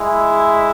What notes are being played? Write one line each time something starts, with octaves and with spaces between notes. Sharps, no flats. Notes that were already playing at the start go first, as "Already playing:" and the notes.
Already playing: G#3 E4